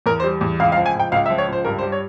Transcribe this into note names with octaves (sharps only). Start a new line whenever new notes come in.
E2 A#4
C5
G3
E2
C#2 F5
F5
F3
G#5
C#2 G5
C#2 F5
E5
F3
C#5
C#2 C5
G2 A#4
C5
G3
C#5